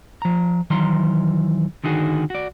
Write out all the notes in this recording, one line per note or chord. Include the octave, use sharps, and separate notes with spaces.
F3 A#5
D#3 E3 F#3 A#5 C6
D3 D#3 D#4 F#4 G#4
F#4 D5